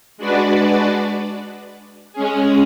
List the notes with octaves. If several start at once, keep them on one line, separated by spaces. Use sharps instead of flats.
G#3 D4 F#4 B4 D5
G#3 C#4 G#4